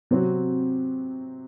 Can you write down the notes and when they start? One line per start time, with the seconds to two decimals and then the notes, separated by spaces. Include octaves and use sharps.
0.11 C3 F#3 C4 F#4